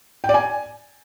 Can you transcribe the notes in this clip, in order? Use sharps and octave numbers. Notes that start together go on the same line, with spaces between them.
G5
D5
G#5